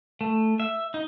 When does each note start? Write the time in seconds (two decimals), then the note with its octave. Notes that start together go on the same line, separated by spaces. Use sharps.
0.21 A3
0.60 E5
0.94 D#4